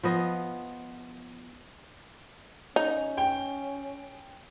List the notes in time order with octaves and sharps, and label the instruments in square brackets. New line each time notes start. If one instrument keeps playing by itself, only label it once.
[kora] F3 B3 D#5
[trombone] C#4 [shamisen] D#4
[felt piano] G5